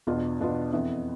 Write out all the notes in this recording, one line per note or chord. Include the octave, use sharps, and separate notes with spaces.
E2 B2 B3 D4 F4
E2 B2 B3 D4 F4
F2 E3 B3